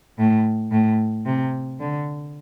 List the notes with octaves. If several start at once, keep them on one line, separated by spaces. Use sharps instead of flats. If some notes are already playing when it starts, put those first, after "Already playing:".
A2
A2
C3
D3